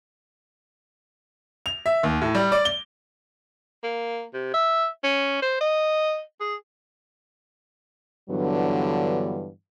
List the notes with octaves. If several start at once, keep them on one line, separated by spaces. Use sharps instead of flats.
F7
E5
D#2
A2
G3
D5
G7
A#3
C3
E5
C#4
C5
D#5
G#4
G2 D3 E3 F#3 B3